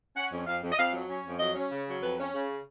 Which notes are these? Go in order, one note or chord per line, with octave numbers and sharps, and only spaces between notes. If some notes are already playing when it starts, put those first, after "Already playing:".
C#4 F#5
F2
F2 F5
F2
D#5
F2 F5
F#3
C#4
F2
F#3 D#5
C#4
C#3
F#3
F2 B4
C#4
C#3